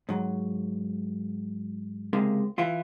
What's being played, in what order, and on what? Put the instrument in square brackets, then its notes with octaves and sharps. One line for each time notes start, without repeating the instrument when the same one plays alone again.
[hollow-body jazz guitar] G#2 F#3
C#2 C3 G#3 A#3
E3 E4 F4